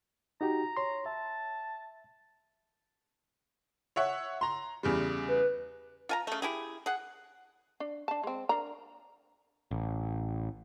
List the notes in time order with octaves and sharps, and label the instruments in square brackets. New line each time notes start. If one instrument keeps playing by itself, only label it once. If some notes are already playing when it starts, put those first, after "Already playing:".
[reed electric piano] D#4 F#4 G4 [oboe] A#5
[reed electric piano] C#5 C6
[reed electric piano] E5 [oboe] A5
[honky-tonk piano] C#5 E5 F#5
A#5 C6
E2 C#3 G3
[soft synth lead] B4
[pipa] F4 G#5 A#5
C#3 A3
E4 G4 G#4
G#4 F#5
[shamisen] D4
D4 A5
G#3 C4
D4 A#4 A#5
[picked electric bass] A1